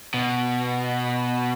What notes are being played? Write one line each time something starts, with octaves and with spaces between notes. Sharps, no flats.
B2